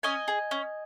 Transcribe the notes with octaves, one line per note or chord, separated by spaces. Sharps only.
C#4 D#5 G#5
G#4
C#4